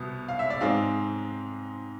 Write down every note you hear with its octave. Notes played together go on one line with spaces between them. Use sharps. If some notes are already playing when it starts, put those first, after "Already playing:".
Already playing: C2 B2 B3
F5
E5
D5
G#2 G#3 C4 F5